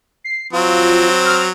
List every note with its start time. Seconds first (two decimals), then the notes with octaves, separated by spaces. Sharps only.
0.24 C7
0.53 F#3 C4 F4
1.26 F6